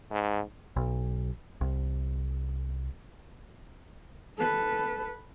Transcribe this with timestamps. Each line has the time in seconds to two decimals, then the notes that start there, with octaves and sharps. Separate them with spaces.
0.11 G#2
0.76 B1
1.61 C2
4.38 A4 B4